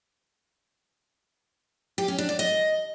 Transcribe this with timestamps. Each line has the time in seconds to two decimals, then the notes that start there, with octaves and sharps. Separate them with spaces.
1.98 G4
2.08 C#4
2.18 D4
2.29 D5
2.39 D#5